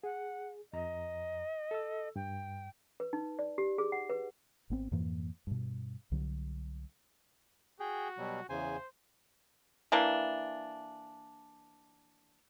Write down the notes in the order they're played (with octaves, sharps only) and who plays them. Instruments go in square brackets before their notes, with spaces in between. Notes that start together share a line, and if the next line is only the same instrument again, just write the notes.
[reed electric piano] G#4 [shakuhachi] F#5
[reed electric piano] F2 A#5 [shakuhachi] D#5
[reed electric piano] A4 E6
[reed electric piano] G2 [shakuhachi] G5
[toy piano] B4
D#4
D5
G4
G#4
F#5
B4
[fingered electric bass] G#1 B3 C4
F2 G#2 E3 A#3
G2 B2
C2 D3 F#3
[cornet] F#4 [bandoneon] G#4 G5
[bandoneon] B2 F#3 G3
[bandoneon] E2 C#3 G#5 [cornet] C5
[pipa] E3 A#3 D4